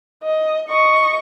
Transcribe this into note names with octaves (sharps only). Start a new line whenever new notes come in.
D#5
D#5 C#6